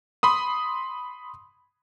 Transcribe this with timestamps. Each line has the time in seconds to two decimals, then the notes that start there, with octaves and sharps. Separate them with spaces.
0.23 B5 C6 D#6